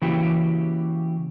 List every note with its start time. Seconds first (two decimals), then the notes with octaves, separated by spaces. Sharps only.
0.02 C#3 E3 A#3 E4 F#4 G4